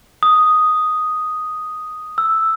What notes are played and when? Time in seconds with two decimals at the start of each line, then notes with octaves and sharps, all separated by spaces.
0.23 D#6
2.18 E6